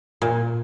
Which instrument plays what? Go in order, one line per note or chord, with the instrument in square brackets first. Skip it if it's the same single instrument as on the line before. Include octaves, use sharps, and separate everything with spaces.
[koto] A#2